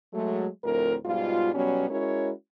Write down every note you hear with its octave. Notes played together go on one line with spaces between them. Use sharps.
F#3 G#3 A3
D2 A2 F3 C4 A#4
G#2 B2 G3 F4
B2 F#3 G3 B3 C#4
G#3 C#4 E4 F#4 A#4 C#5